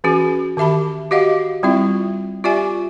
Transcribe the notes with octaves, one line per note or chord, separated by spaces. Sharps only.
E3 C#4 F#4 G#4
D#3 G4 E5 A5 B5
F#4 G4 D#5 F5 F#5
G3 C4 E4 F4 E5
F4 G4 D5 E5 G#5